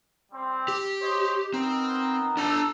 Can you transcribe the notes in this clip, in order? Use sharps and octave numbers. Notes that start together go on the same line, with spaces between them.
G3 C4
G4
C5 C#5 D#5
B3 C4 D#4 A#4
D4 A4 A#5